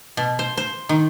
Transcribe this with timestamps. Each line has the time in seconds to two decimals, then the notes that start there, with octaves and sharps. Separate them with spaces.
0.17 B2
0.39 C5
0.57 C5
0.89 D#3